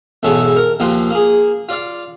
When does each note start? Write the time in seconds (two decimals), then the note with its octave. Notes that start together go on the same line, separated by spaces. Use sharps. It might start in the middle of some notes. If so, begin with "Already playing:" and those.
0.23 B1 E2 G#2 A4 C#5 G#5
0.57 A#4
0.80 D#2 A#2 F3 C6
1.10 A#3 G#4
1.69 F4 D5 F5